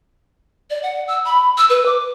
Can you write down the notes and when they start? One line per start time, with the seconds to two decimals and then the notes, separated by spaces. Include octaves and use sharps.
0.70 D5
0.83 F#5
1.08 E6
1.25 B5
1.58 E6
1.70 B4
1.86 D6